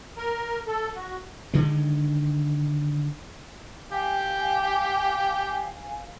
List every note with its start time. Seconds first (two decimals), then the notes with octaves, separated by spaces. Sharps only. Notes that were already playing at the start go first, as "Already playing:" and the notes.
0.17 A#4
0.67 A4
0.95 F#4
1.54 D3 D#3 G#3
3.91 G4 F5 G5 G#5